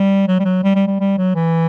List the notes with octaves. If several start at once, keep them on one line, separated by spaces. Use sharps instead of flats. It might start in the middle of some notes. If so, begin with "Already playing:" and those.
Already playing: G3
F#3
G3
F#3
G3
G3
G3
G3
F#3
E3